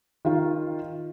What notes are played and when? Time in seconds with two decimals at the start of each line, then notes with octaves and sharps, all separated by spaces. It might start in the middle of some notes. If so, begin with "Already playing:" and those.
0.25 D#3 F4